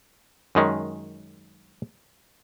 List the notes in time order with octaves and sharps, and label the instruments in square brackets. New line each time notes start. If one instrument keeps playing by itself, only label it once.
[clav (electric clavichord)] F#2 D#3 G#3 C#4